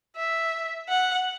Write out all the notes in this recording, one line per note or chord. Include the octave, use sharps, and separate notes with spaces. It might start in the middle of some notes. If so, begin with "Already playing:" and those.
E5
F#5